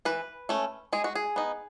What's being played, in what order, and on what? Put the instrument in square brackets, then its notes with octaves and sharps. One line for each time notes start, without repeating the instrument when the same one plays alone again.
[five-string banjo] E3 B4
A3 C#4
G#3 G#4
F#4
G#4
B3 D#4